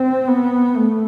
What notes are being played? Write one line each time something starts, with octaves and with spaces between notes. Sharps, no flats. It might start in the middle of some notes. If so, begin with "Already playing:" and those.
Already playing: C4
B3
A3